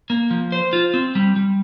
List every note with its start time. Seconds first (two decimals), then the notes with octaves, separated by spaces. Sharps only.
0.10 A#3
0.31 F3
0.52 C5
0.73 F4
0.94 C4
1.15 G3
1.36 G3